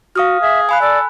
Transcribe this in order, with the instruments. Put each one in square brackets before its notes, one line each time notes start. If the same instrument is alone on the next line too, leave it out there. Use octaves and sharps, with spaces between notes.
[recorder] F#4 [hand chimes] F5 D#6 F6
[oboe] G#4 [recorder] E5
[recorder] F5 [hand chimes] G#5 B5 F#6
[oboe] A4 [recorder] D5